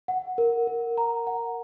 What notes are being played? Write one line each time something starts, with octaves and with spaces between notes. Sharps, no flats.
F#5
A#4
A#4
A#5
F#5